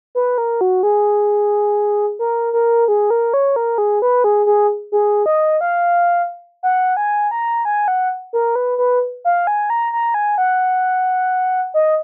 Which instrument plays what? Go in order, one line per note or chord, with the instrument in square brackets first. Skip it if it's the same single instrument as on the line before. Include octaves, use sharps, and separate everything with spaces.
[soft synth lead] B4
A#4
F#4
G#4
A#4
A#4
G#4
A#4
C#5
A#4
G#4
B4
G#4
G#4
G#4
D#5
F5
F#5
G#5
A#5
G#5
F#5
A#4
B4
B4
F5
G#5
A#5
A#5
G#5
F#5
D#5